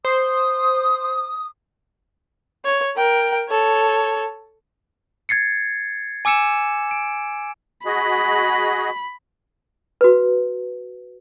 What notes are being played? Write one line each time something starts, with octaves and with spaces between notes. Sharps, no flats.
C5 D#6
C#5
A#4 G5
A4 C#5
G#6 A6 C7 C#7
G#5 D6 E6 C#7 E7
D7
F#4 G#4 D#5 B5
F#4 B4